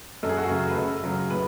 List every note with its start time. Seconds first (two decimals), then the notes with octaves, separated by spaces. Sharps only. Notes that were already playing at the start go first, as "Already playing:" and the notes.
0.23 F#2 A4
0.29 G#4
0.37 F#4
0.44 G#4
0.49 C#3 F#3 A3
0.70 B4
0.76 F#2 A4
1.04 C#3 F#3
1.30 A2 B4